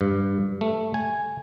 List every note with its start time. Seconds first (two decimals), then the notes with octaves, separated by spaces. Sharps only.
0.01 G2
0.61 A3
0.94 G#5